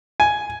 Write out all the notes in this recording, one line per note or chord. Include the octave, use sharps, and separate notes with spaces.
G#5